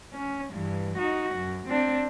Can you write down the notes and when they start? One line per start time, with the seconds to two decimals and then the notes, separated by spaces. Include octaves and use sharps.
0.14 C#4
0.51 G2 E3
0.98 D#4 F#4
1.35 F#2
1.68 C4 D4